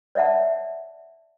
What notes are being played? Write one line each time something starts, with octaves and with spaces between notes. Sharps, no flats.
C#5 D5 E5 F#5 A5